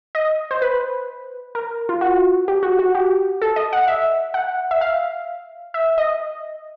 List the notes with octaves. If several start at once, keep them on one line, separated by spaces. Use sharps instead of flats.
D#5
C5
B4
A#4
F4
F#4
G4
F#4
F#4
G4
A4
D#5
F#5
E5
F#5
E5
F5
E5
D#5